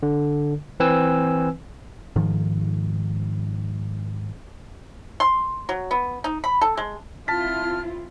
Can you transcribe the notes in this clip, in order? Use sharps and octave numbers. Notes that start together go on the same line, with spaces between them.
D3
E3 C4 B4 G#5 E6
G#2 D#3 F3
C6
F#3
B3
D#4
B5
A4
G#3
C4 E4 F4 A5 F6 A6 B6